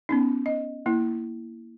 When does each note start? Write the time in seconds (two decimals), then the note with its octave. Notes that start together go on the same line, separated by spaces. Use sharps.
0.09 B3 C#4 D#4
0.46 D#5
0.86 A#3 E4